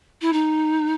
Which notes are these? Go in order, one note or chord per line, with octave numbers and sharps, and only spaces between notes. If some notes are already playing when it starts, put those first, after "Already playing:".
E4
D#4